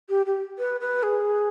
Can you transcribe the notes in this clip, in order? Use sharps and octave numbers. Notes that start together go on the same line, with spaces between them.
G4
G4
B4
B4
G#4